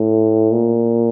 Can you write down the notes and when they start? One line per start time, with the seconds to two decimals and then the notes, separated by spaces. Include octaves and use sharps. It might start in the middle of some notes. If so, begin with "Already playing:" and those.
Already playing: A2
0.53 A#2